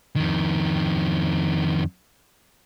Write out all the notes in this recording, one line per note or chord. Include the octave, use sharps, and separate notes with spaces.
F2 D#3